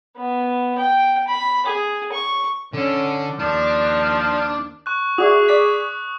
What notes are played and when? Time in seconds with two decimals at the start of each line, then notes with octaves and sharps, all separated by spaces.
0.17 B3
0.78 G5
1.28 B5
1.66 G#4
2.12 C#6
2.73 D3 C#4
3.39 D#2 F3 D4
4.86 C#6 F#6
5.18 F#4 G#4 D5 E5 C#6 D#6
5.48 D5 D6 B6